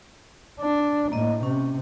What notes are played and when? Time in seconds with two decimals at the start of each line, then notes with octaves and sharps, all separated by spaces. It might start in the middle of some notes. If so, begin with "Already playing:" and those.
0.61 D4
1.12 A2 A#3 D#5
1.43 C3 C#4